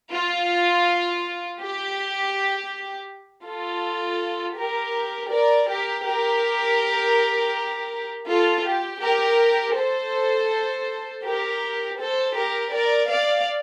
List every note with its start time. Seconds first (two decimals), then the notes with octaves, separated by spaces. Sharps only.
0.12 F4
1.61 G4
3.46 F4 A4
4.57 G4 A#4
5.31 A#4 D5
5.68 G4 A#4
6.05 G4 A#4
8.28 F4 A4
8.65 G4
9.01 G4 A#4
9.76 A4 C5
11.24 G4 A#4
11.99 A4 C5
12.36 G4 A#4
12.73 A#4 D5
13.09 D5 F5